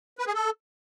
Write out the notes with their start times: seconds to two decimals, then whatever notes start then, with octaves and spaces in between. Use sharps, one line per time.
0.19 B4
0.27 G#4
0.34 A4